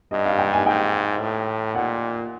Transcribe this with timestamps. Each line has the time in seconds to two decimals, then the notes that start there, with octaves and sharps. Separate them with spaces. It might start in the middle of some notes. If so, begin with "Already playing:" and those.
0.11 G2 D#5
0.26 F5
0.39 G5
0.53 G#5
0.66 G#2 G5
1.20 A2
1.75 A#2 F#5